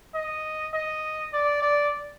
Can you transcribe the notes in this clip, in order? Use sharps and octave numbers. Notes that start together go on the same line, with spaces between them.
D#5
D#5
D5
D5